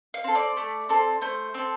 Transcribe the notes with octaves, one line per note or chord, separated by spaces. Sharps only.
F5
C4 A4
D5
A3
C4 A4
A3 C5
C4 A4